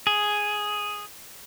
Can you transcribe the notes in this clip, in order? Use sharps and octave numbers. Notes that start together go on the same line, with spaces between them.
G#4